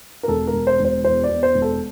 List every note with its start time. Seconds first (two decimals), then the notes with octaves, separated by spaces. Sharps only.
0.23 A#4
0.28 E1 A4
0.47 A#4
0.53 E1
0.67 C5
0.80 E1
0.85 C5
1.04 E2 C5
1.24 D5
1.29 E2
1.43 C5
1.55 E1
1.62 A4